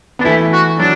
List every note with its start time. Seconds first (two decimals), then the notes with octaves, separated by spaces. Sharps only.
0.19 B3 D4
0.24 E3 A3 E4
0.52 F#4
0.79 F#3 D4